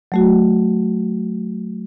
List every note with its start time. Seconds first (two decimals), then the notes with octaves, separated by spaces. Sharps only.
0.12 F#3 A3 F#4